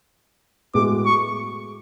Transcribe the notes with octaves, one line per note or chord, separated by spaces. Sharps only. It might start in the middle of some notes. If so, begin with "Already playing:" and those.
A2 G#3 B3 F#4 D6
C#6